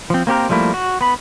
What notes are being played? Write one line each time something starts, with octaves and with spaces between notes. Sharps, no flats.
F3 C4
A#3 C4 G4 A#4
F3 G3 A3 A#3 E4
F#4
B3 B5